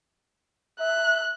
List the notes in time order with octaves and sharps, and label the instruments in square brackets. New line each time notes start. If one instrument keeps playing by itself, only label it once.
[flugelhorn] E5 [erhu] F#6